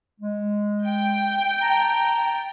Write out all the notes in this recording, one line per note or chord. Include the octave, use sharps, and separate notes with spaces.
G#3
G5
A5 A#5